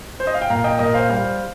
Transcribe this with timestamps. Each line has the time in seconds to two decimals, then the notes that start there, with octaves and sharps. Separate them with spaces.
0.20 C5
0.27 D#5
0.34 F5
0.42 G5
0.50 A#2 F5 A#5
0.64 D#5 G5
0.79 A#2 A#4 D#5
0.94 C5 F5
1.09 G3 C5 F5